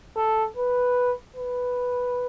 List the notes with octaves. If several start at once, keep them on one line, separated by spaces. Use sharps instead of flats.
A4
B4
B4